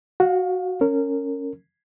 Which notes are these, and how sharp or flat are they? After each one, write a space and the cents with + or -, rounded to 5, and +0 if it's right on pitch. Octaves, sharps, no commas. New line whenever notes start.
F#4 +0 F5 +30
C#4 +0 A#4 -25